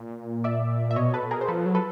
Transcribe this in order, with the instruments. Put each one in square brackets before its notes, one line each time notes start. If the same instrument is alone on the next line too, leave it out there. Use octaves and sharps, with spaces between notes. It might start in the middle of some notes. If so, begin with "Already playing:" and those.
Already playing: [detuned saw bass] A#2
[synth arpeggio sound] D5 E5
E5
[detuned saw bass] B2 [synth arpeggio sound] C#5 D#5
[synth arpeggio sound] A4 B4
[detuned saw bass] B2
[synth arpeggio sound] G#4 A#4
C5
[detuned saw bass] F3 [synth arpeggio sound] A4 B4
[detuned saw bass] F#3
[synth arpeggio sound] A4 B4